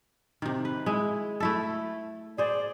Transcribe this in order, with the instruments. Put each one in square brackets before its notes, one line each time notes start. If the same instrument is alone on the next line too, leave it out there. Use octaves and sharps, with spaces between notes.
[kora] C3 D#3
B4
G#3 E4
A3 E4 A4
[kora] G#4 C5 [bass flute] D5